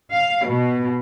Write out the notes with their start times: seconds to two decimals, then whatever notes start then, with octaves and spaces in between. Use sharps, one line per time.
0.14 F5
0.48 B2